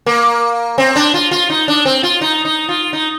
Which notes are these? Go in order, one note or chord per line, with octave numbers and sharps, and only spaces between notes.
A#3
C4
D4
F4
F4
D#4
D4
C4
F4
D#4
D#4
F4
D#4